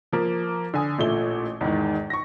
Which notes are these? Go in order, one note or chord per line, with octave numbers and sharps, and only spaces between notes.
F3 A#3
D3 G#5 D#6
A1 A#2 A3 G7
E2 G#2 D#3
C#6 A#6